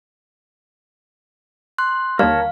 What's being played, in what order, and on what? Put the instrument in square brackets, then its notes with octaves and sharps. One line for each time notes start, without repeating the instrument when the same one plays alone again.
[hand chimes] C6 F#6
[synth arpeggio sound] D#2 D3 G3 [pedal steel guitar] A#4 C#5 A5 [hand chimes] F5